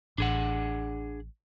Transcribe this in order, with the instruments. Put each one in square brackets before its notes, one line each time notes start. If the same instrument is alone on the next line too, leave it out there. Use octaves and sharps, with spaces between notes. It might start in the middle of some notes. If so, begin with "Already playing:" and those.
[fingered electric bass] A1 [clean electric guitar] D4 G#4 F#5